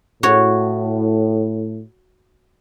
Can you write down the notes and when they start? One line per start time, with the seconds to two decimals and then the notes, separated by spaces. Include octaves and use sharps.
0.23 A2 F#4 C#5